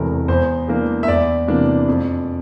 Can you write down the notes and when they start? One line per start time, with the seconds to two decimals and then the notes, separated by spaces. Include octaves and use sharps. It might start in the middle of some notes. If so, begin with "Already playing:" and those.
Already playing: E1 E2 C3 E3 A3 A#4
0.28 E2 C5
0.68 E3 A#3 D4
1.03 E5
1.08 E2 D5
1.48 C3 E3 A#3 D4
1.88 F2